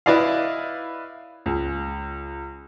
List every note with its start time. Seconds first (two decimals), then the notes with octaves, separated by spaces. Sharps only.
0.06 E4 B4 D5 D#5 F5
1.46 C#2